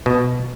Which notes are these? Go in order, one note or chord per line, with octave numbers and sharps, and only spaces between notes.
B2